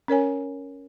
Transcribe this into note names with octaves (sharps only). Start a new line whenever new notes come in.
C#4 A#4 C#5 G#5